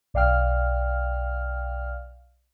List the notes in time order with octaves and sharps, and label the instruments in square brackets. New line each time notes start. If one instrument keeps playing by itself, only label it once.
[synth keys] B1 D5 F5 G5 F6